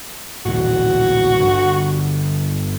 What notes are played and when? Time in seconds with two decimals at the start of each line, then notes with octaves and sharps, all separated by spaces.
0.46 A#1 D#2 A2 F#4
1.40 G1 D3